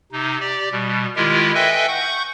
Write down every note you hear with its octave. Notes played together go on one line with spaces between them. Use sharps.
C3 D#4
G4 D5
B2 G3
D#3 G#3 E4 F4 G4 A#4
A4 B4 D#5 E5 G5 G#5
F#5 C#6 G6